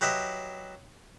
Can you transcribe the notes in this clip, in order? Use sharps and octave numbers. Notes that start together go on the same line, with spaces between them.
F#3 G4 B4 D#5 E5